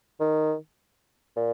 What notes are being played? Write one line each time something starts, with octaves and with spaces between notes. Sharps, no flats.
D#3
A#2